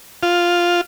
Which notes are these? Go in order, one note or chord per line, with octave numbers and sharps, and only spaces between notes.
F4